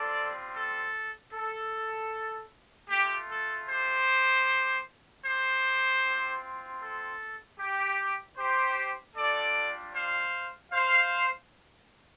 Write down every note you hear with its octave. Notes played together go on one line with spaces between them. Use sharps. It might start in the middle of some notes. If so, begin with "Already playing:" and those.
Already playing: G3 C4 F4 A4 D5
A4
A4
A3 F4 G4
A4
G4 C5
G4 C5
C4 F4
A4
G4
G4 C5
G3 D4 F4 A4 D5
C5 F5
C5 F5